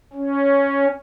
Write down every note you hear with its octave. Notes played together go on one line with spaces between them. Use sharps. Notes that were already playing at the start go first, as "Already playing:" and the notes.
C#4